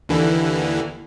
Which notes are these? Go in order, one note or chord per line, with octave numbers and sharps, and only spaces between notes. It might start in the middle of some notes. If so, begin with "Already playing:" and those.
D#2 D3 E3